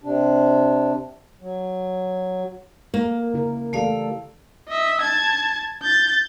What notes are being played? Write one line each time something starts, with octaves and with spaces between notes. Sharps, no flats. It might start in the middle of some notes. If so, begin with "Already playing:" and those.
C3 D4
F#3
A#3 A#4
C#3 E4 A#4
E3 A3 G4 A4 D5 F5
D#5 E5
A5 G#6
G6 A6